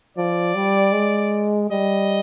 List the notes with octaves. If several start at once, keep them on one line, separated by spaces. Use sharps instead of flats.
F3 D5
G3
G#3
G3 D#5